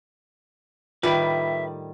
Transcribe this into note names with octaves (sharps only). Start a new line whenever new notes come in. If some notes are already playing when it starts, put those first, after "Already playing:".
A2 D#3 G3 F4 B4 E5